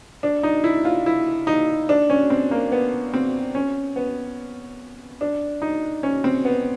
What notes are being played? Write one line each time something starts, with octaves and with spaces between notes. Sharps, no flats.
D4
D#4
E4
F4
E4
D#4
D4
C#4
C4
A#3
B3
C4
C#4
B3
D4
D#4
C#4
C4
B3